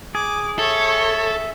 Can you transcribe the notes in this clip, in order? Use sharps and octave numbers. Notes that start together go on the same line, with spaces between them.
G#4 D6
A4 C#5 E5